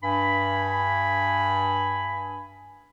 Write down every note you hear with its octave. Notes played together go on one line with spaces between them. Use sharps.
G2 G#5 B5